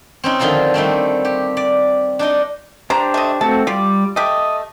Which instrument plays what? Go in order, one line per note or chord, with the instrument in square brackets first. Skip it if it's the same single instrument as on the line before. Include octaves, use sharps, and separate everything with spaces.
[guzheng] C4 C#4 D#4
D3 D#3 F3 D#4 F4 A4
D#3 G3 A3 C4
G4
D5
D4 D#4 D#5
[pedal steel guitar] D4 G4 C5 [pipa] A#5
[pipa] A3 D#5
[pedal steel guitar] A3 C4 F#4 [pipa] A5
[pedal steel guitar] G3 D5 [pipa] F4 G4
[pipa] A3 G4 [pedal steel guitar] D#5